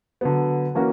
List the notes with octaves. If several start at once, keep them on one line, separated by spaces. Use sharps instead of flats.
D3 F#3 B3
E3 A#3 C#4 F#4 A#4